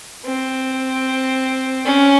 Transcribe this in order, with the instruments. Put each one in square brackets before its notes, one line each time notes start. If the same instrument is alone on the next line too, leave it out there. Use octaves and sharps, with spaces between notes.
[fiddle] C4
C#4